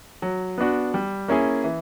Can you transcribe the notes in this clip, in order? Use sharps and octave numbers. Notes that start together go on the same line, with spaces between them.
F#3
B3 D4 F#4
G3
A#3 C#4 E4 G#4
E3